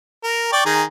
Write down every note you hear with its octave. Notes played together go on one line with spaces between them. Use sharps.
A#4
D5 G5 C#6
D#3 G#4 A#5